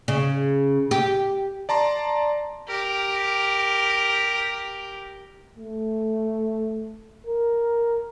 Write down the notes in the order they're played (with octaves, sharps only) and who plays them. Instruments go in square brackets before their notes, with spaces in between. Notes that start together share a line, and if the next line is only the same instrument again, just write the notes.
[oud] C#3
G4
[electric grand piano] D5 A5 A#5 C6
[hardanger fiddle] G4 A#4
[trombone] A3
A#4